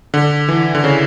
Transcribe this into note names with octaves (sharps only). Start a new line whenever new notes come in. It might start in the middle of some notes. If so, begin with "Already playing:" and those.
D3
E3
D3
C#3